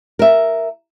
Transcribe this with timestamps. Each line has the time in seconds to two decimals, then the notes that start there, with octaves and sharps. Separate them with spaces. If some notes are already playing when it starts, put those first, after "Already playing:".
0.19 A#4 E5